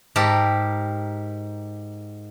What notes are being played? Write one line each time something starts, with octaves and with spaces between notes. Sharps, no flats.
G#2 G4 A#4 A5